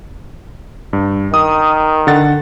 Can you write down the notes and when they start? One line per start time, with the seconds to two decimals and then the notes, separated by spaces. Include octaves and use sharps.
0.93 G2
1.34 D#3 D#6
2.07 D3 F#5 A6